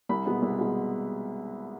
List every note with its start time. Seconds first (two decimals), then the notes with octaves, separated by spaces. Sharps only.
0.09 C2 B5
0.26 B2 G#3 B3
0.42 C2
0.58 B2 G#3 B3